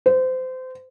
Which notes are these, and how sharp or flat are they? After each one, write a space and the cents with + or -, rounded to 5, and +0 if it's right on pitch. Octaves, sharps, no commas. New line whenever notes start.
C5 -25